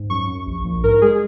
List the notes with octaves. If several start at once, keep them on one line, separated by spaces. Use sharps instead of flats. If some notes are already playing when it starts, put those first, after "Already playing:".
Already playing: G#2
F#2 C#6
F#2
A#1
A#1
G#2 A#4
G#3 G#4